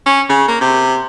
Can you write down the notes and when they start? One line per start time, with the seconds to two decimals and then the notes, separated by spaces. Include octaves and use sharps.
0.06 C#4
0.29 C#3
0.48 A#3
0.61 C3